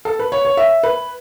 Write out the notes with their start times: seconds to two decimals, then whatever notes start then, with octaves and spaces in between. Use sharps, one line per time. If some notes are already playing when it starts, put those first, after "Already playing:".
0.05 A4
0.19 B4
0.32 C#5
0.45 C#5
0.57 E5
0.83 B4